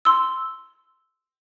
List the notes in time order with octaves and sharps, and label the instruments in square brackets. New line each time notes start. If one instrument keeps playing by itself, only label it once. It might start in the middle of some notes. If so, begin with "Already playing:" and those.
[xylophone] C6 E6